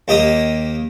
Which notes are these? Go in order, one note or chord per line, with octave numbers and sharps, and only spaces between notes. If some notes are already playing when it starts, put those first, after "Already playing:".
D#2 A#3 G4 D#5 D#6